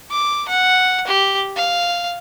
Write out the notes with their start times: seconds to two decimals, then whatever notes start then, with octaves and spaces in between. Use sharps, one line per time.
0.11 D6
0.48 F#5
1.07 G4
1.56 F5